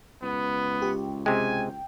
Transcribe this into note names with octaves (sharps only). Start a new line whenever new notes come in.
C#2 B3
G4
C3 G#3 G5 G#5